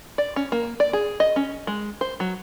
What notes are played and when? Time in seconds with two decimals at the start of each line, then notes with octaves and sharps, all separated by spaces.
0.18 D5
0.36 C#4
0.52 A#3
0.80 D5
0.93 G#4
1.20 D#5
1.36 C#4
1.67 G#3
2.01 C5
2.20 F#3